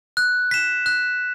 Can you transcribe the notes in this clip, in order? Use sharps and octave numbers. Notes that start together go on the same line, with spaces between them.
F#6
B6 E7
F#6